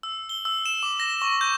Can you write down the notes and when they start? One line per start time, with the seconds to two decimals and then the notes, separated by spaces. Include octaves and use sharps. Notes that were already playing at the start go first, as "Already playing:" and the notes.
0.03 E6
0.29 G7
0.45 E6
0.66 E7
0.83 D6
1.00 A#6
1.22 C#6
1.41 G6